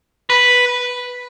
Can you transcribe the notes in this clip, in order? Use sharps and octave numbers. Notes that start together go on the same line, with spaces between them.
B4